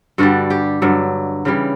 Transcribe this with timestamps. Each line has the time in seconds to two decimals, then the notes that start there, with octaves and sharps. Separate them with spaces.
0.18 G2 D3 G3 F#4
0.50 G4
0.82 G2 D3 F#3
1.45 C#3 E3 G3